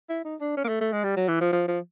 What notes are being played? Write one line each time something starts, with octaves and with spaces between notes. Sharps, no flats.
E4
D#4
D4
C#4
A#3
A3
A3
G#3
G3
F#3
E3
F3
F3
F3